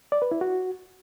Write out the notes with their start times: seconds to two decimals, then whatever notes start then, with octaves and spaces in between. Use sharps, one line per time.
0.12 D5
0.22 B4
0.32 E4
0.41 F#4